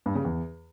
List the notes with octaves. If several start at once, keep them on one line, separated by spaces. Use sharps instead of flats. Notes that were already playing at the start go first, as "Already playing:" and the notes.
G2
C#3
E2